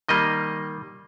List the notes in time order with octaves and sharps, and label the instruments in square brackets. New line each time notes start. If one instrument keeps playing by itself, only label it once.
[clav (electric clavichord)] D#3 G3 A#3 D#5